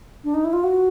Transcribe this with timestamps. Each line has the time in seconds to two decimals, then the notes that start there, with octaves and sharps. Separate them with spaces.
0.24 D4
0.34 D#4
0.44 E4
0.53 F4
0.64 F#4